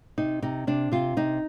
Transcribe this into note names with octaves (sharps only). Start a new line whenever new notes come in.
C3 D#4
C3 D#4
C3 D4
C3 F4
C3 D#4